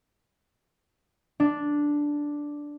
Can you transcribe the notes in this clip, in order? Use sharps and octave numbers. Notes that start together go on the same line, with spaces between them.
D4